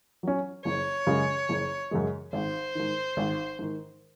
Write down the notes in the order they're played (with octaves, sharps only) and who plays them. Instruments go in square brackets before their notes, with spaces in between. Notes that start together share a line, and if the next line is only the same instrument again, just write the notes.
[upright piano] F#3 C#4
[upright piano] F#1 [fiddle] C#5
[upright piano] F#2 C#3 G#3
F#1
F#2 C#3 G#3
[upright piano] G#1 [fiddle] C5
[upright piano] G#2 D#3
G#1
G#2 D#3